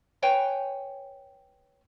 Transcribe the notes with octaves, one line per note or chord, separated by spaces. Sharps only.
B4 C#5 G5 G#5